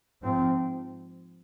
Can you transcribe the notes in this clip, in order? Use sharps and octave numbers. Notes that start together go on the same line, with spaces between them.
G#2 F3 C4